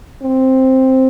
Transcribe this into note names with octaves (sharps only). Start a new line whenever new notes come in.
C4